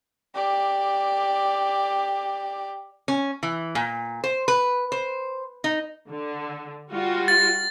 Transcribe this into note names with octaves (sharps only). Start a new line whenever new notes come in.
G4 D5
C#4
E3
A#2
C5
B4
C5
D#4
D3
G3 F4 F#4
A6